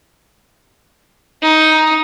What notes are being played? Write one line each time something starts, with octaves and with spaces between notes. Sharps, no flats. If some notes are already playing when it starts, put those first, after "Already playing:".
D#4